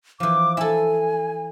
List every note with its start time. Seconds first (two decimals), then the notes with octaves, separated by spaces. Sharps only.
0.20 E3 F3 D6
0.57 E4 A4 G#5